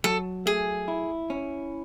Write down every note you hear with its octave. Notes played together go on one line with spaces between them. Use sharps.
F#3 A4
A3 G#4
E4
C#4